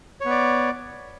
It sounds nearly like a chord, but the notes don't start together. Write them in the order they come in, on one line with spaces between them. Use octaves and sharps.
C#5 B3 D5